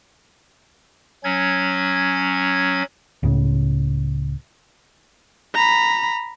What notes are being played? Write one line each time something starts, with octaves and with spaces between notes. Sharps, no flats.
F#3 C#4 G#6
C#2 A2 C#3
A#5 B5